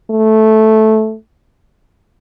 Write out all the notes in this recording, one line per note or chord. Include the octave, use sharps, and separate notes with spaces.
A3